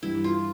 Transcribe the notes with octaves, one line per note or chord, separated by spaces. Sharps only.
G2 E3 G3 E4
F4